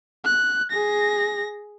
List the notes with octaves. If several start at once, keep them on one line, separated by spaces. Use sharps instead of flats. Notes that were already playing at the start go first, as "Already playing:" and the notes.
F#6
G#4 A#6